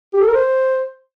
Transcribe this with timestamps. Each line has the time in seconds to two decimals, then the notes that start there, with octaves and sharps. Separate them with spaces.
0.13 G4
0.20 A4
0.27 A#4
0.34 C5